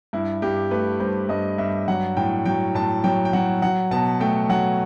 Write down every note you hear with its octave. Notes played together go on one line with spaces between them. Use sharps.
G2 E4
G2 G4
A3 B4
G2 C5
G2 D#5
G2 E5
F#3 F#5
A2 G5
F#3 G5
A2 A5
F#3 G5
G5
F#3 F#5
F#3 F#5
B2 A5
A3 G5
F#3 F#5